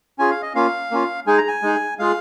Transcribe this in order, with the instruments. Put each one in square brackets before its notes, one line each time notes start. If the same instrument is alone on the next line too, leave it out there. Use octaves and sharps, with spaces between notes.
[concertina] C#4 F4 G#4 G#5
F5
D#5
A#3 C#4 F4 F5
A#3 C#4 F4
G#3 D#4 G#4 G#5
A#5
G#5
G#3 D#4 G#4
G#3 F4 G#4 F5